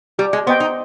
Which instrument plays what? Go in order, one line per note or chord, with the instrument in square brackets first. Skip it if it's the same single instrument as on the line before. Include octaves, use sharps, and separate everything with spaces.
[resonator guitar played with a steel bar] G3 [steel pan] G4
[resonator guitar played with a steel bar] G#3
[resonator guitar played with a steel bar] B3 [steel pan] C5 D#5 G5
[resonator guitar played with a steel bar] D#4